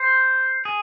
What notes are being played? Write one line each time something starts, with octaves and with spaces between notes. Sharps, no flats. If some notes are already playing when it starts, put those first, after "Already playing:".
Already playing: C5
G#4